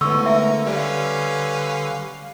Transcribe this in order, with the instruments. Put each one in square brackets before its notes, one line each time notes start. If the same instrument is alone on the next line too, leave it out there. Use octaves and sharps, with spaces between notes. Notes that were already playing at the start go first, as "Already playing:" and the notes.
[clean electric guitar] D2 G#3 B3 [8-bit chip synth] D3 [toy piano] C#6 E6
[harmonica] A#4 [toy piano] E5
[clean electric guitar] G3 [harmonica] C#4 B4 F5